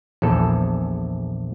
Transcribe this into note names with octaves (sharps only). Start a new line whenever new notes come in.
A#1 E2 A4